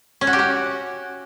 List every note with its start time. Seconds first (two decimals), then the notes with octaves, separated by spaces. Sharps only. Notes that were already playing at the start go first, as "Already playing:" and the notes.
0.21 C#4
0.27 F#4
0.33 G4
0.39 F#4